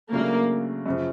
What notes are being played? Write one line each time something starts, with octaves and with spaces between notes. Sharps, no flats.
C#3 F#3 A3 A#3 D4
F#2 C#3 F3